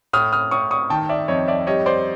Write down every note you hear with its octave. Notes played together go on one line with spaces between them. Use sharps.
A2 D#6 F6
D#6 F6
A2 C#6 D#6
C#6 D#6
D#3 G5 A5
D5 E5
F2 C#5 D#5
D5 E5
G3 C#5 D#5
C5 D5